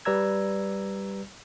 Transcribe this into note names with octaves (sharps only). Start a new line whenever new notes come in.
G3 B4 D5 A#5 E6 G#6